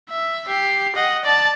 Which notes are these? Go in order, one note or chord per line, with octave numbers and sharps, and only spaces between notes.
E5
G4 C7
D#5 F#5
D5 A5